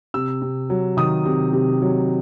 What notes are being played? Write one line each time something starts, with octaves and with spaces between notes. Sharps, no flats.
C3 E6
C3
F#3
D#3 D#6
C3
C3
F#3